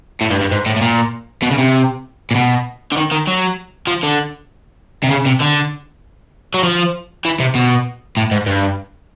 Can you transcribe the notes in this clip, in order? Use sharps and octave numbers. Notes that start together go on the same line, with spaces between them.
A2
G2
G2
G#2
A2
A2
A#2
B2
C#3
C3
A#2
B2
D3
D#3
D#3
F#3
F3
D3
C3
C#3
C3
D3
F#3
F3
E3
C3
B2
A2
G#2
G2